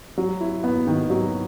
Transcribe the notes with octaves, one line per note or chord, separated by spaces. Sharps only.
F#3
E4
B3
D#3
F#3